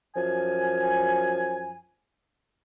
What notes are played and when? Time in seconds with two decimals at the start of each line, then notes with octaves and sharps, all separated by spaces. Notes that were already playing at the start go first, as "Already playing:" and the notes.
0.15 F#2 F3 G#5